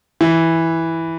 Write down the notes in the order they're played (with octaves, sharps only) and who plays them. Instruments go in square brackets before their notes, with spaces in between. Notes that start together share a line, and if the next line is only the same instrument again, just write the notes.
[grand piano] E3